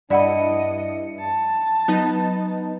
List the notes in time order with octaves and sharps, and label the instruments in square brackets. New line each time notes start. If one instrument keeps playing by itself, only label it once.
[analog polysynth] G2 E4 C#7 [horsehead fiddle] D4 D#5 [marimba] D5 F#5 B5
[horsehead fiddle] A5
[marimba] F#3 [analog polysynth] B3 D#4